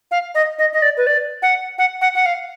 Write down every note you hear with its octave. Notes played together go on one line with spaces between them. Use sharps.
F5
D#5
D#5
D#5
D5
B4
D5
F#5
F#5
F#5
F#5
F5